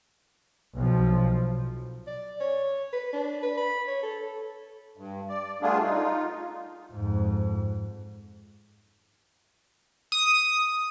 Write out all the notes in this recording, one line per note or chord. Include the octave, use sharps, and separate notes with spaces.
B1 B2 F3
D5
C#5
B4
D4
B4
B5
C#5
A4
G2
D5
G3 A3 B3 D4 F4 G#4
D#4 F4
F2 G#2
D#6